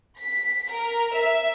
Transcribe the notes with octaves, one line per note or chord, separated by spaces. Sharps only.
B6
A#4
E5